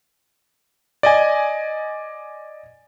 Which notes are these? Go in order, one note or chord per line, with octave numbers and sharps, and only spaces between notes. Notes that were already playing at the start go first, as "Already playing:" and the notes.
D5 D#5 G#5